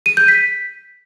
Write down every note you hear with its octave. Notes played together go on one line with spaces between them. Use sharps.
D#7
G6
B6